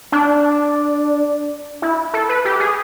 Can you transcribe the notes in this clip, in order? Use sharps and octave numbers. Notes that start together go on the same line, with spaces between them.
D4
E4
A4
B4
G4
G#4